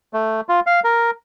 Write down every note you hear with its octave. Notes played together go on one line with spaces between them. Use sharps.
A3
F4
F5
A#4